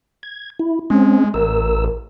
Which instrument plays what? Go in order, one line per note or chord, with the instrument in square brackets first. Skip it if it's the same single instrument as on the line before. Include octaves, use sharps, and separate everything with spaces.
[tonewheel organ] G#6
E4
[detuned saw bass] G#3 [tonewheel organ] C4 C#4
[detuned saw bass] A1 [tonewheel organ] A#4 E6